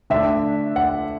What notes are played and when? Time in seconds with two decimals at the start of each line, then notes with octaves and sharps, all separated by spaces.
0.10 D3 A3 D4 E5
0.76 F#5